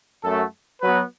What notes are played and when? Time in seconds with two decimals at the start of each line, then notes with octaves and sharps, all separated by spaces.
0.24 F#2 A3 F#4 A4
0.82 F#3 B3 F#4 B4